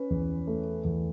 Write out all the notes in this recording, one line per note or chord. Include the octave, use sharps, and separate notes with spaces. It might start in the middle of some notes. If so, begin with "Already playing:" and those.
Already playing: C#4 B4
E2
A3
E2